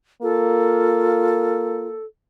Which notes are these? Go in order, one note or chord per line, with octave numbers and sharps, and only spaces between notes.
A#3 F4 A4